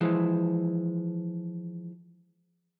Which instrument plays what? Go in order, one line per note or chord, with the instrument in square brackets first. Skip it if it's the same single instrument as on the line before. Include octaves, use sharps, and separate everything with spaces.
[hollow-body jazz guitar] E3 F3 G#3